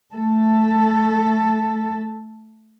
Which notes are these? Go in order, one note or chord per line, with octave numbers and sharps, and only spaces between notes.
A3 A4